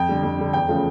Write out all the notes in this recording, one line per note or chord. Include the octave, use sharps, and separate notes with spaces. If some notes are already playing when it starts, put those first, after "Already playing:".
Already playing: F2 G5
D3 G3
F2
D3 G3
E2 G5
C#3 F3 A3